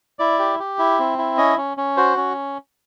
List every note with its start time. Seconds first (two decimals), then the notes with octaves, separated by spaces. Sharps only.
0.19 E4 D5
0.39 G4
0.60 G4
0.79 E4
0.99 C4
1.18 E4
1.37 C#4 D#5
1.58 C#4
1.77 C#4
1.97 F#4 C5
2.17 C#4